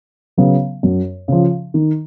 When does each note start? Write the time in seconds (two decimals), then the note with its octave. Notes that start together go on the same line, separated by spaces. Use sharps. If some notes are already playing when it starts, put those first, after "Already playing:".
0.37 C#3 F#3 B3
0.83 F#2
1.28 C#3 F3
1.74 D#3